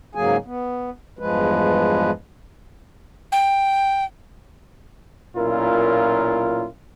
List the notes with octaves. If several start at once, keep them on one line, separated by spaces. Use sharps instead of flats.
G#2 C#3 F#3 A#3 G#4 G#5
B3
E2 G2 F3 G#3 B4
G5
B1 A#2 C#4 E4 F4 A#4